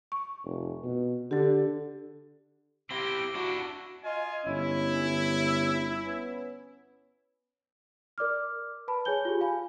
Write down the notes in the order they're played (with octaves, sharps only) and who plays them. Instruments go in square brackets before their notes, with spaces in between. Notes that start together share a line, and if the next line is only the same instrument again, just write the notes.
[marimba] C#6
[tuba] F1
B2
[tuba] D3 [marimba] G4 A4
[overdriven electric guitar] C4 E4 [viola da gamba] G4 [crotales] A#6 G7
[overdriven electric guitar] D4 E4 [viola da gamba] F#4 [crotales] C#6
[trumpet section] F4 G#5 [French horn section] D#5
[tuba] G1 [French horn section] C#4 [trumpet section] E4
[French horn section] B3 C#4
[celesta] A#4 D5 D6 F6
B4 A5 B5
G#4 C#5 G#5 G6 G7
F4 G4 G#4
F5 G#5 B5